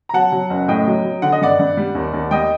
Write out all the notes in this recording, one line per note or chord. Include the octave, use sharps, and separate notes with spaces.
A#5
F#3 F#5 A5
F#3
F#1
A2 D#5 G5
F#3
F#3
D3 F#5
D#5
G2 D5 F#5
G2
G3
D#2
D#2
G3 D#5 G5